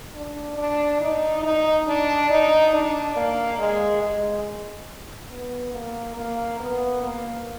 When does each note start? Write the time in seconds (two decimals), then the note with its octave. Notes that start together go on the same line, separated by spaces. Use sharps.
0.15 D4
0.58 D4
1.01 D#4
1.43 D#4
1.87 D4
2.30 D#4
2.74 D4
3.16 A#3
3.58 G#3
4.02 G#3
5.31 B3
5.74 A#3
6.17 A#3
6.59 B3
7.02 A#3